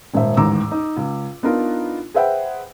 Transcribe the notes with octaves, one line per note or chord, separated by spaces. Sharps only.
D#1 G#2 C5 E5
A1 D#2 G#2 A#5 D6 E6
D#4
C#2
B3 D4 D#4 F4 A#4
G#4 B4 C5 E5 F#5 G5